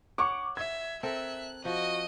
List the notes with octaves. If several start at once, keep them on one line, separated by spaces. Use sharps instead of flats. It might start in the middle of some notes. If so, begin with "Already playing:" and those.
C#5 F#5 C#6 D6
E5 G#6
C4 A4 A#4 E5 F#6
F3 F#4 D#5